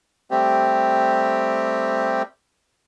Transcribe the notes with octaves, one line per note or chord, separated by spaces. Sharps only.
G3 A3 C4 G4